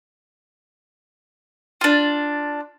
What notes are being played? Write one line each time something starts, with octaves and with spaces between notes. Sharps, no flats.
D4 F4